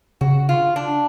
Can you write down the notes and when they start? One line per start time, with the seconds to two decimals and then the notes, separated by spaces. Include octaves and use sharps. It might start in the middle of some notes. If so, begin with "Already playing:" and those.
0.21 C#3 F#4
0.49 F4
0.76 D4